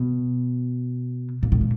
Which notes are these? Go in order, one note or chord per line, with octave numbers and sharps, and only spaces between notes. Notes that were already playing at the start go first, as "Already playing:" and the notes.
Already playing: B2
A#2
A2
A#2